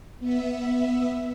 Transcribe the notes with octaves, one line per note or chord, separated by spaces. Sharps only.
B3 E5